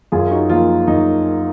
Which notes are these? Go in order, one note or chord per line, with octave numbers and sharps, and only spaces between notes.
F#2 F4 G#4
D#4 F#4
F3 A#3 F4
F#2 D#4